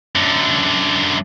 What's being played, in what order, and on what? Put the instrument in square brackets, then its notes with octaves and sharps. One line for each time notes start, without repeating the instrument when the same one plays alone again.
[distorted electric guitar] F#2 D3